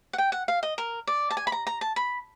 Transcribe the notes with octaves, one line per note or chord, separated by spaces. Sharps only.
F#5
G5
F#5
F5
D#5
A#4
D5
A5
G#5
B5
A#5
A#5
A5
B5